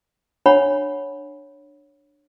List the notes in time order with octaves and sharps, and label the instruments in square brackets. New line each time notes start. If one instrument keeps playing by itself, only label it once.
[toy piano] D4 C#5 F#5 B5